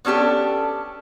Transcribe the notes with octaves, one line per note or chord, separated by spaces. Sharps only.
B3 C#4 D4 G4 A4